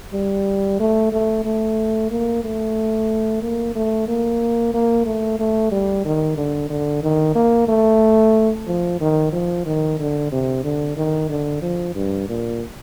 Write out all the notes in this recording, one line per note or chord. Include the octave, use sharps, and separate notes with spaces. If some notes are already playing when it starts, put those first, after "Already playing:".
G3
A3
A3
A3
A#3
A3
A#3
A3
A#3
A#3
A3
A3
G3
D#3
D3
D3
D#3
A#3
A3
F3
D#3
F3
D#3
D3
C3
D3
D#3
D3
F3
G2
A#2